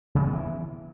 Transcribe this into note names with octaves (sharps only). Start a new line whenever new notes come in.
C#3
B3
E3